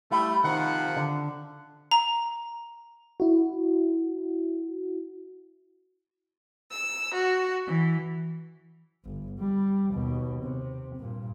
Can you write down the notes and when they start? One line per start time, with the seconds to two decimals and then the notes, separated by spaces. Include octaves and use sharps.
0.12 G3 A3 E4
0.44 C3 D#3 F3 F#5
0.96 D3
1.91 A#5
3.20 E4 F#4
6.71 E6
7.15 F#4
7.66 E3
9.06 G1
9.39 G3
9.91 D#2 B2
10.43 C3
10.96 G2 A#2